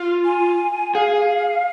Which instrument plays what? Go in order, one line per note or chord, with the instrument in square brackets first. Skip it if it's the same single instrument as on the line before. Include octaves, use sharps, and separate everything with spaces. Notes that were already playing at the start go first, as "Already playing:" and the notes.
Already playing: [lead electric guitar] F4
[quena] G#5
[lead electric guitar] G#4 [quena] F5